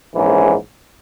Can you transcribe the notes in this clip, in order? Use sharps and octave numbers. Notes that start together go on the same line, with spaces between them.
A#1 G#2 E3 G#3 C#4